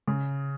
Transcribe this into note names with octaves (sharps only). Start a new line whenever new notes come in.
C#3